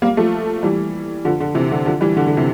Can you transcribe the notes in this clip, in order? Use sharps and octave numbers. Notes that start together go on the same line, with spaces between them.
G3 A#3
F3 A3
E3 G3
D3 F3
D3
C3 E3
D3
D3 F3
E3 G3
D3
D3
C3 E3